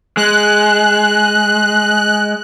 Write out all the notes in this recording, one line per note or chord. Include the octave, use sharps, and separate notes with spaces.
G#3 F#6